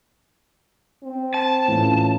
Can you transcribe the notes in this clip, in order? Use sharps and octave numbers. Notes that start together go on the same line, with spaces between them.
C4
A5
A2 E3 C#4 F4